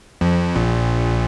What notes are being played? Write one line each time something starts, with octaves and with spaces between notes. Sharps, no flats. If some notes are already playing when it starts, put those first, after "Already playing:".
F2 F3
A#1 A#2